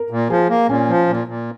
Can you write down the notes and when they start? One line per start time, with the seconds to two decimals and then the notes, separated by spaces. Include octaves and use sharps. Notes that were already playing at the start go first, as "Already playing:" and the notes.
Already playing: A#4
0.10 A#2
0.30 F3 G#4
0.49 A#3
0.69 A#2 C#4
0.88 F3
1.08 A#2
1.27 A#2